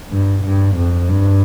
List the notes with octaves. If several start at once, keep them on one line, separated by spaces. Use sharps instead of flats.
G2
G2
F2
G2